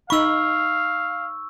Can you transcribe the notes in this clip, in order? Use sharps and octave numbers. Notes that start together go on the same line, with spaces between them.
D#4 F5 B5 C#6 E6